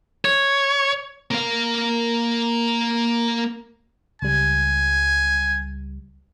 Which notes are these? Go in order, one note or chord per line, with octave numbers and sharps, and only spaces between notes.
C#5
A#3 F5
C#2 G3 G#5